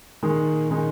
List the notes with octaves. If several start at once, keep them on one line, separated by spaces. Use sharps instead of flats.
A#2 D#3 G#3 D#4
D#3 G#3 D#4